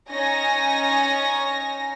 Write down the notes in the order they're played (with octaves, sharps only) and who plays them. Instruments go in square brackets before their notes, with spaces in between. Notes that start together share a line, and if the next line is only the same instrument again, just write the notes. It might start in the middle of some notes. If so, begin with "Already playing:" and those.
[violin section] C#4 D#4 C#5 G#5 A#6